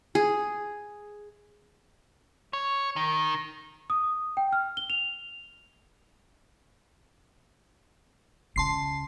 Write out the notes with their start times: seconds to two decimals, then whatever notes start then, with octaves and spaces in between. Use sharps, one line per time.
0.15 G#4
2.53 C#5
2.96 D#3
3.90 D#6
4.37 G5
4.53 F6
4.77 G7
4.90 F7
8.56 C#2 C#3 A5 C6 C7